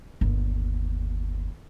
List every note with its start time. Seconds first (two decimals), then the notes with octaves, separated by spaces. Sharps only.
0.21 G1 D#2